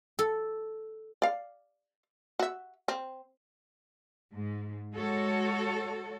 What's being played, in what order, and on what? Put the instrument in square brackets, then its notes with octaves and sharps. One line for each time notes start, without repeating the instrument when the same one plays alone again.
[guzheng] A4
[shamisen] D5 F5
F#4 E5
C4
[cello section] G#2
G#3 F#4 A4 C#5